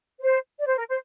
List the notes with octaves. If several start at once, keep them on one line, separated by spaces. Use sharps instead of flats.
C5
D5
C5
A#4
C5